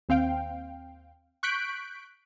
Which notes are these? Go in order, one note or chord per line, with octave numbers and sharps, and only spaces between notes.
D#2 C4 F5 G5
C#6 F#6 G6 B6 D7